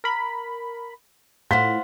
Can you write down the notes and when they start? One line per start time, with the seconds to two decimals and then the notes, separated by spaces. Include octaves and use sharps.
0.04 A#4 B5
1.51 A2 F4 C5 F#5 B6